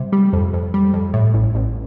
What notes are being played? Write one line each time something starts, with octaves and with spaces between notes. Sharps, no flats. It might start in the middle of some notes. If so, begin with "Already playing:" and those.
Already playing: C3 G3
G3
F2
F2
G3
F2
A2
A1
A1